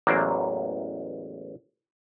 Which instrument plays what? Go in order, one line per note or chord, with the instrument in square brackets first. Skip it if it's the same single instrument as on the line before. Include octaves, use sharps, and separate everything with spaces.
[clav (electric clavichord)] A1 E2 F#3 A#3 C5 D5